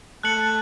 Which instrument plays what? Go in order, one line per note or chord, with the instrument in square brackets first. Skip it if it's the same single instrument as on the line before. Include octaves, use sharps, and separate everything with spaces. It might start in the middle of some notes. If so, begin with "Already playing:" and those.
[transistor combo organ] A3 [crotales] F#6 C#7 F#7